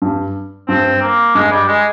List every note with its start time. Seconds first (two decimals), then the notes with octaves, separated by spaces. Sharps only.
0.02 G2
0.68 G2 C4
1.01 A#3
1.35 G2 G#3
1.51 G3
1.67 G#3